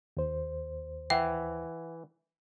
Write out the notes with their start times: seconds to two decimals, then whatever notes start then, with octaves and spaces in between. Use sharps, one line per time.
0.17 D#2 C5
1.10 E3 E5 F#5 G5